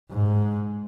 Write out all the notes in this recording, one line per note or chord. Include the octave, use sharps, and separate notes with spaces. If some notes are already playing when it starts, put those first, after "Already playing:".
G#2